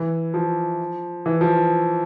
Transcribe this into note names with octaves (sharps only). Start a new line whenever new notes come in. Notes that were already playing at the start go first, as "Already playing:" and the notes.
Already playing: E3
F3
E3
F3